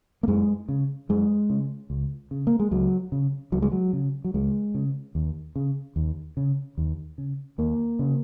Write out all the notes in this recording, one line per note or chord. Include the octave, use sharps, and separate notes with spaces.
A#3
F#2 G#3
C#3
F#2 G#3
C#3
C#2
C#3
A#3
G#3
C#2 F#3
C#3
C#2 F#3
G#3
F#3
C#3
F#3
C#2 G#3
C#3
D#2
C#3
D#2
C#3
D#2
C#3
D#2 A#3
C#3